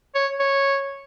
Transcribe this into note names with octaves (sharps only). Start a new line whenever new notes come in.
C#5
C#5